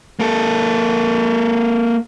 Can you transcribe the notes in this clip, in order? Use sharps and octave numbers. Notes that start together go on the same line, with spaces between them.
A#3 A4